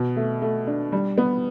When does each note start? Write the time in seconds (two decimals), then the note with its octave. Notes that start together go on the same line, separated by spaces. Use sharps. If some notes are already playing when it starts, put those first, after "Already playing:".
Already playing: B2
0.16 A3
0.42 A3
0.67 D4
0.92 G3
1.18 B3